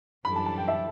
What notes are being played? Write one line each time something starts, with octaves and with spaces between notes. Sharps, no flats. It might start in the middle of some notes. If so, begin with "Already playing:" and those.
F#2 E3 G3 D4 A4 B5
A5
A5
G5
E5